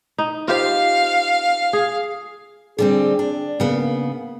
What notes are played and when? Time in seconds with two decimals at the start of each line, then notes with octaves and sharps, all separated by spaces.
0.18 D#4
0.48 F4 G4 C5 F5
1.73 G#4
2.78 D3 G3 C4 G#4
3.19 D4
3.60 C#3 A#3 B3